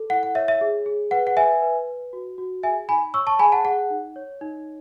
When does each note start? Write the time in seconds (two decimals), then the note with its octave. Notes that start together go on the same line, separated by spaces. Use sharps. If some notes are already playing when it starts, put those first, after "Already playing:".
Already playing: A4
0.10 E4 F#5
0.23 F#5
0.35 C#5 E5
0.48 E5
0.61 G#4
0.86 G#4
1.11 B4 F#5
1.27 F#5
1.37 B4 E5 G#5
1.62 B4
1.87 B4
2.13 F#4
2.38 F#4
2.63 G#4 E5 G#5
2.89 D#4 G#5 B5
3.14 C#5 C#6 E6
3.27 A5 C#6
3.39 G#4 G#5 B5
3.52 F#5 A5
3.64 G#4 F#5
3.90 D#4
4.16 C#5
4.41 D#4